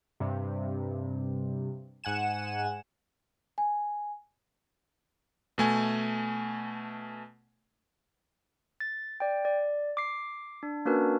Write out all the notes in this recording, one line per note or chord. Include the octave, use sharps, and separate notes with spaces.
G2 C3
G#2 F#5 G#5 E7
G#5
B2 A3 G#5
A6
D5 G5
D5
D6 C7
D4
A#3 C#4 D4 F#4 A#4 B4